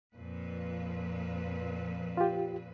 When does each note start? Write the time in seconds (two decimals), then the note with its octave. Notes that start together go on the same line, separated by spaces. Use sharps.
0.13 F2 A#2 B4
2.17 F4 G4